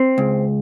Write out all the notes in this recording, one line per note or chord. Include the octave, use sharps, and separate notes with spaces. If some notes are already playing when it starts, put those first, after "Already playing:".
Already playing: C4
C#2